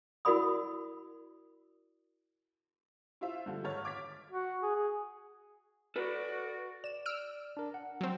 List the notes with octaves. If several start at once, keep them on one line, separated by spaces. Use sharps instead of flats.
E4 F#4 A#4 D5 B5 D#6
E4 F4 C5 E5 F5
D3 F3 G3
G#1 C#5 F6 A6
D6 G#6 A6 B6
F#4
G#4
G#4
F#4 A4 B4 D5
D5 E7
E6 F6 D7
D4 A#4
F#5
F#3 C4